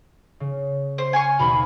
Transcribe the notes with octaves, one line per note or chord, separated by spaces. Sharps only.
C#3
C5
G#5 C6 C#6 F6
D#2 B2 B5